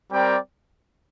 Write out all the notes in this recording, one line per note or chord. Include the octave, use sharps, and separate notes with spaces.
G3 C4 A#4 D5 G5